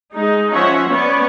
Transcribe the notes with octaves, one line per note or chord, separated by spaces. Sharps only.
G#3 D#4
F3 C#4 C5 C#5 E5 F#5
B3 C#4 C#5 D5